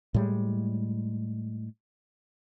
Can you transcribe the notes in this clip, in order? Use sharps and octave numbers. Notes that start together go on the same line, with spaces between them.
A2 G3 G#3